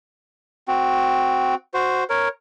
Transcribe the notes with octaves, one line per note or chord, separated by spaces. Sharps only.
C4 F#4
F#4 C5
A#4 C#5